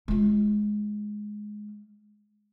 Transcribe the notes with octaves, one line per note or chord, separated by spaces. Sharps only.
G#3 F4